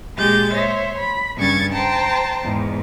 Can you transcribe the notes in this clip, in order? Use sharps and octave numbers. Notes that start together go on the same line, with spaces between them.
A#2 G#3 G4 G#4 G6 A6
C5 C#5 E5
B5
G2 C#3 G3 C#6 G#6 A6
C5 G5 A5 A#5
E2 G#2